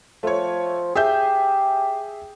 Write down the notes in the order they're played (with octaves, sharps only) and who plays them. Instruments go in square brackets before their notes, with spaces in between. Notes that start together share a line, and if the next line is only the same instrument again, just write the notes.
[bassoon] F3 [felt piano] A3 C#5
[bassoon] G4 [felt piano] G#4 E5 G6